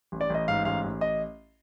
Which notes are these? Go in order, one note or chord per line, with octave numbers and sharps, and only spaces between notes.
A1
D5
A1 D#5
G#2 F5
A1 F5
A1
D#5